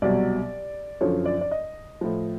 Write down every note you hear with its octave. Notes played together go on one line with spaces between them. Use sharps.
C2 B2 F#3 D5
F#2 D3 F3 C#5
D5
D5
D#5
A2 F3